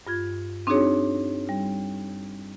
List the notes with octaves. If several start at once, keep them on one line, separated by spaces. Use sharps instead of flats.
G2 F4 G#6
C4 D4 D#4 F#4 G#4 C#5
G3